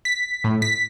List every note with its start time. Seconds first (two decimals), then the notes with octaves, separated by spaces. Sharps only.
0.05 B6
0.44 A2
0.62 B6